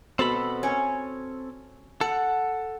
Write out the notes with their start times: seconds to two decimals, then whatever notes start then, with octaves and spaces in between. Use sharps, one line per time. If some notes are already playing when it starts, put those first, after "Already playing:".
0.19 B2 C4 A4 B5
0.63 C#4 C#5
2.01 A4 F#5